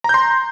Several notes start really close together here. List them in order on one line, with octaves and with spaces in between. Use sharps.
A#5 G6 C6